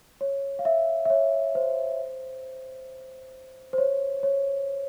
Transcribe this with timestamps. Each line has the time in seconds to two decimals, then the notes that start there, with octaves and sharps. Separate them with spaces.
0.21 C#5
0.59 F5
0.65 E5
1.05 E5
1.10 C#5
1.55 C5
3.73 C5
3.78 C#5
4.23 C#5